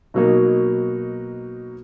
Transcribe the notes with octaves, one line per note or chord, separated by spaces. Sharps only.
B2 F#3 A#3 D#4